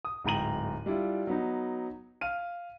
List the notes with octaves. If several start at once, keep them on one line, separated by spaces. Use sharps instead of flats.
D#6
D1 G#2 G5 A#5 D#7 F#7
G3 D4 E4 F4
F#3 B3 D#4
F5 F6 D#7